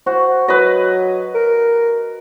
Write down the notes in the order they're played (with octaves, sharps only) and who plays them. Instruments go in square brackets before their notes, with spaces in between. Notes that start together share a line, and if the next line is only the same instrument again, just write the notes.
[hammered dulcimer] F#4 [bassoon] C5
[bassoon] F#3 [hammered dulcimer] B4 D#5
[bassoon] A#4